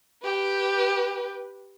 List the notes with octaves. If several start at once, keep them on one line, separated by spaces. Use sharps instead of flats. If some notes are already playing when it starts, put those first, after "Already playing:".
G4 B4